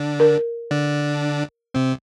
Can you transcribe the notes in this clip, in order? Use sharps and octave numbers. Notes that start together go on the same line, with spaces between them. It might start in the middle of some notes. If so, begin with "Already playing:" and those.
Already playing: D3 D4
A#4
D3 D4
C3 C4